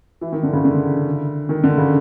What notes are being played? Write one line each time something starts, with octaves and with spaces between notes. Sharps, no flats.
E3
D#3
D3
C#3
D3
D#3
D3
C#3